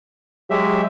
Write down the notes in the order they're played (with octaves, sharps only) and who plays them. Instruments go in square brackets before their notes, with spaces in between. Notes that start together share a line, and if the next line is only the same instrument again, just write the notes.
[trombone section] F#3 G#3 [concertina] G4 E5